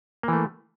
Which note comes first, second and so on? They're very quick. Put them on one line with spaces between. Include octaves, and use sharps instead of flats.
A#3 E3 A3